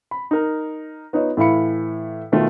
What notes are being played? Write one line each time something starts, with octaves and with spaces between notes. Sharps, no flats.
B5
D#4 A#4
B3 D#4 F4 C#5 D#5
A2 E3 E4 F5 B5 C#7
B2 D#3 A3 F4